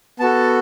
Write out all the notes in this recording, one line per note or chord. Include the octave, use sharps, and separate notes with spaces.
B3 F#4 A4 A5